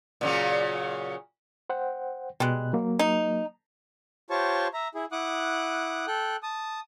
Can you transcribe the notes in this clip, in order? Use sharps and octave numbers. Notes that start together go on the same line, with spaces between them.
A#2 C#3 F#3
C5 F#5 G5
B2 G3 G#3 F#6
F#3 A#3
D#4
F4 G4 C5 C#5 A5 C#6
E5 A#5
E4 G#4
E4 F#5 D6 D#6 F#6
A4 G5 F#6
A5 D#6